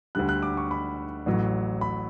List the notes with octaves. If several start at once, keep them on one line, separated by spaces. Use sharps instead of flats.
D2 D3 G3 F#6
F#6
D6
C#6
B5
A1 A2 F#3
B5